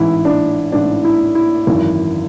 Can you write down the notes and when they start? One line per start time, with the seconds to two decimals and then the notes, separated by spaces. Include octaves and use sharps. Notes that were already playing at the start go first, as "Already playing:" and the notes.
Already playing: A1 G#2 E3 E4
0.25 D4
0.72 A1 G#2 E3 D4
1.05 E4
1.35 E4
1.67 G#1 F#2 E3